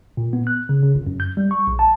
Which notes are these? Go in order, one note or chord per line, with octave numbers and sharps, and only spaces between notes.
A#2
B3
F#6
C#3
C#3
G1
F#2
G6
G3
C#6
A#1
A5